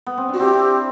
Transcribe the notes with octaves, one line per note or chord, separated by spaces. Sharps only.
B3
C4
D4 F#4
C4 E4 G4